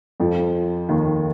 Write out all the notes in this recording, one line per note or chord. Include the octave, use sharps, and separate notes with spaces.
F2 F3
D#2 D#3